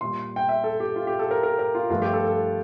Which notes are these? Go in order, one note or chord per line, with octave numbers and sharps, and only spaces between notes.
A#2 G3 C6
G5
E5
A4
G4
F4
G4
A4
A#4
A#4
A#4
F4
G2 F3 A3 F4
G4
A4
A4